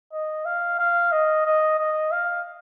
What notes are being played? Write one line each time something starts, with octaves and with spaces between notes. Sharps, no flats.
D#5
F5
F5
D#5
D#5
D#5
F5